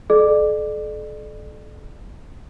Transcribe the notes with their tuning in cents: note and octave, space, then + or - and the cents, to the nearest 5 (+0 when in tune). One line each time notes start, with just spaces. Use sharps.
A4 -40 D5 +35